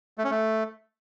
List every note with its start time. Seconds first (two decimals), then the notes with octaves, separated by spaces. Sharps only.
0.18 A3
0.24 C#4
0.31 A3